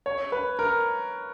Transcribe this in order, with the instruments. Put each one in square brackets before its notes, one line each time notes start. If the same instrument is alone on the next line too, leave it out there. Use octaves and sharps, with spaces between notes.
[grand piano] C#5
B4
A#4